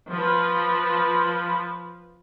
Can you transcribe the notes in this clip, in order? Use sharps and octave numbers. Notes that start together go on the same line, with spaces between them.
F3 B4